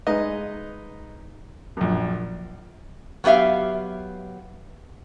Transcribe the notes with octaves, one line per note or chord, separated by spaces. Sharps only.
G#3 D#4 B4 D#5
A#1 F#2
F#3 B3 G4 E5 F5